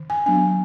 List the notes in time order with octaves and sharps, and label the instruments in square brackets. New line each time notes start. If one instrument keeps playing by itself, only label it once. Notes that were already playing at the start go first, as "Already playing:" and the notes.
Already playing: [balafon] D#3
G#5
F#3 B3 D4 G#5